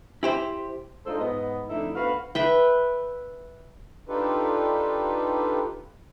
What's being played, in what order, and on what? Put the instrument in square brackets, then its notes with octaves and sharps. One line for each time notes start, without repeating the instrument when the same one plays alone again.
[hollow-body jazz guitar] E4 G4 C5
[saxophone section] G#3 D4 D#4 F4 A4 C5
G#2 B3 D#5
F2 D3 A3 D#4 E4
D2 B3 F#4 B4 F5
[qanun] B4 E5 G5
[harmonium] D4 D#4 F4 G4 A4 B4